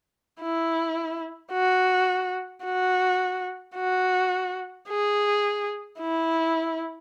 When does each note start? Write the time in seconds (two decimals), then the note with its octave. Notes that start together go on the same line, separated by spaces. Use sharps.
0.42 E4
1.52 F#4
2.65 F#4
3.76 F#4
4.89 G#4
6.00 E4